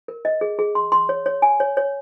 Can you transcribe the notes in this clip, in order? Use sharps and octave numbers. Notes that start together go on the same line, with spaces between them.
A#4
D#5
G#4
G#4
C6
C6
C#5
C#5
G#5
C#5
C#5